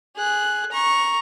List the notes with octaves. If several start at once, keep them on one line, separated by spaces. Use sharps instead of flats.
G#4 F#6
A#5 C#6